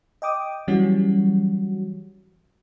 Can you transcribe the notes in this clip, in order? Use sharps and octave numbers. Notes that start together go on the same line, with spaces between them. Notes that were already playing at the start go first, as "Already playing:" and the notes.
D#5 G5 D6 D#6
E3 F#3 G3 C#4 F#4